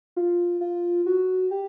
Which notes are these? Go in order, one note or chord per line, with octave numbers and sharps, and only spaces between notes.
F4
F4
F#4
G4